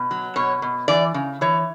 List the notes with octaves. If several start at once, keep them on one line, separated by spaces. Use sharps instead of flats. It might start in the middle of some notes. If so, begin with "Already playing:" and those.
Already playing: B2
F#3
B2 C#5
B2
E3 D5
C#3
E3 C#5